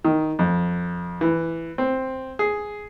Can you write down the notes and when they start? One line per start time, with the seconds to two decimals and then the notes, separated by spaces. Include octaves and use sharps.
0.05 D#3
0.39 F2
1.21 E3
1.78 C4
2.39 G#4